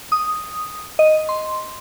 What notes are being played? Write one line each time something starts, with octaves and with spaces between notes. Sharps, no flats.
D#6
D#5
C6